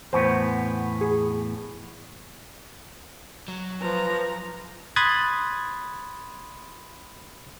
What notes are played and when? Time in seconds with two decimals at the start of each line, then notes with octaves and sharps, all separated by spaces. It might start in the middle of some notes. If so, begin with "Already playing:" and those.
0.13 E2 A2 B3 C5
1.01 G#4
3.48 F#3
3.82 F3 B4 A#5
4.96 B5 C6 D#6 F#6 G#6 A6